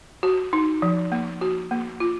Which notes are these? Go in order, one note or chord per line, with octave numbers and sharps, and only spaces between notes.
F#4
D#4
F3
A#3
F#4
A#3
F4